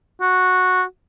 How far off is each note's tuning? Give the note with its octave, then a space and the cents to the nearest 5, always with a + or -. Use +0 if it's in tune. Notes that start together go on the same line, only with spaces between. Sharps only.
F#4 -10